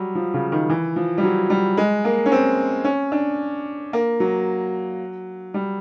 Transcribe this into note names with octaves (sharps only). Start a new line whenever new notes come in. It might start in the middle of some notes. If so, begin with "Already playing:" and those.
Already playing: F#3 G3
F3
C#3
D#3
E3
F3
G3
F#3
G3
G#3
A#3
C#4
C4
C#4
D4
A#3
F#3
G3